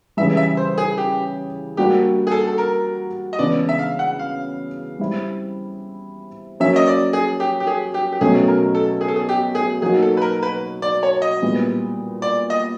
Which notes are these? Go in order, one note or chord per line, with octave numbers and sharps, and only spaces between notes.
C#3 E3 G3 E5
E5
C5
G#4
G4
G3 A#3 D4 F#4 G4
G#4
A4
A4
A#4
D#5
C#3 E3 G#3 B3 D4 D5
E5
F5
F#5
F5
G3 C4 E4
F#3 A#3 C#4 E5
D#5
D5
G#4
G4
G4
G#4
G4
G4
B2 F#3 A3 C#4 G#4
A#4
A4
G#4
A4
G#4
G4
G#4
F#3 A#3 D#4 F#4 G#4
A4
B4
A#4
B4
D5
C#5
D#5
A#2 G3 B3 E4
D5
D#5